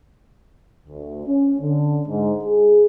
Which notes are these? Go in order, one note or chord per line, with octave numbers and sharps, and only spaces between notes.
D2
C#4
D3
G#2
G#4